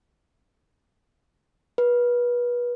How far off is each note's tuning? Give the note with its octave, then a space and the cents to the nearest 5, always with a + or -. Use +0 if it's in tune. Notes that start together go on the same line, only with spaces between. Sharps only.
B4 -30